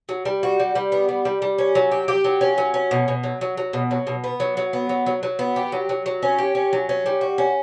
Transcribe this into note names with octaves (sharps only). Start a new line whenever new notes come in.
F#3
G3
F#4
G3
G3
B3
G3
G3
G3
C#4
F#3
G4
G4
F#3
C#4
F#3
C#4
B2
B2
F#3
F#3
F#3
B2
F#3
B2
B3
F#3
F#3
B3
F#3
F#3
F#3
B3
G4
F#3
F#3
F#3
C#4
G4
C#4
F#3
C#4
G3
F#4
C#4